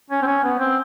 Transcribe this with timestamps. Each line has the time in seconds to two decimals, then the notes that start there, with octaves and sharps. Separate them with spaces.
0.10 C#4
0.22 C4
0.26 C#4
0.43 B3
0.59 C4